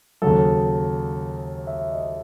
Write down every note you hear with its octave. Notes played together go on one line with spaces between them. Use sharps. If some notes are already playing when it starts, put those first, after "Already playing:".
D#2 C#3 F#3 A4
E5
D#5